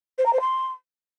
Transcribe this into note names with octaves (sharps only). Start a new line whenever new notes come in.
C5
A#5
C5
C6